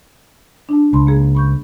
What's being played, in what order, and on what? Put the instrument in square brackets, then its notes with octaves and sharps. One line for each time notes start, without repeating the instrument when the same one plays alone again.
[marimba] D4 E4 A5
[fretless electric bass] C#2 [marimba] A5 B5 C6
[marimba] A#3 G#4
B5 C#6 G6